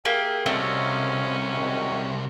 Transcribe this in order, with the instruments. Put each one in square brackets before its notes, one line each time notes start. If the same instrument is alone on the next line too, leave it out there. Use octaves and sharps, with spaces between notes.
[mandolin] A#3 G4 [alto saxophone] G#4 [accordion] E5 F5 G5
[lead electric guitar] C2 C3 [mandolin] A3 C4 [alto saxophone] C#4 [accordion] F#4 D#5 F5
[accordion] D#3 G#3 F#4